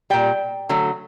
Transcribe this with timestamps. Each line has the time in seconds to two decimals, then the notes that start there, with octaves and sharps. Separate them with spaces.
0.10 A#2 G3 G5
0.69 D3 F#3 A3